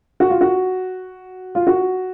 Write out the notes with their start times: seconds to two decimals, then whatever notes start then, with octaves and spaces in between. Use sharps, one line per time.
0.20 F#4
0.30 F4
0.41 F#4
1.55 F4
1.67 F#4